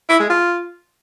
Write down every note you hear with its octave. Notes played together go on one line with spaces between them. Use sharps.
E4
G#3
F4